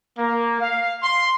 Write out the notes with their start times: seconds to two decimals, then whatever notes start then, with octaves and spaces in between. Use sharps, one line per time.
0.17 A#3
0.59 F5
1.02 C6